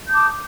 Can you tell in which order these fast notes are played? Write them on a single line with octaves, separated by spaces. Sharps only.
G6 D#6 A5 D6